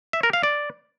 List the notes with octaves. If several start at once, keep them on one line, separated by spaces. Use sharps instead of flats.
E5
A#4
F5
D5